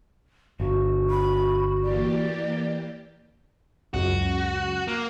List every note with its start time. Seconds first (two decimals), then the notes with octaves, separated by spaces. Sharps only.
0.60 G1 F#4
1.10 B5
1.83 E3 A#3 G4 D5
3.94 C#2 F#2 F#4
4.88 A#3